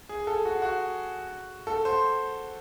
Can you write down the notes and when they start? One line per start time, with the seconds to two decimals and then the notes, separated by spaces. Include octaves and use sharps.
0.09 G#4
0.27 A4
0.45 F#4
0.62 F#4
1.67 A4
1.85 C5